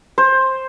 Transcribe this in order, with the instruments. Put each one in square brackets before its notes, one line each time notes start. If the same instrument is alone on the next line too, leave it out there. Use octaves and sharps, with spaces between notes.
[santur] C5